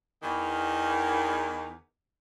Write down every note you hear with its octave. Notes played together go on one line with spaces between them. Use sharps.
E2 D#3